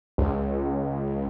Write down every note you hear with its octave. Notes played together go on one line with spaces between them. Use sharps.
C#2